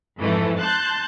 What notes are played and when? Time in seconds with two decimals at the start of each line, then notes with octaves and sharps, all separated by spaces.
0.20 F2 G#2 E3 A3
0.58 A5 C6 F#6 G6